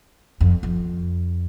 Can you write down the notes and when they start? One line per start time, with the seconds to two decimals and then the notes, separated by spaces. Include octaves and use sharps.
0.41 F2
0.63 F2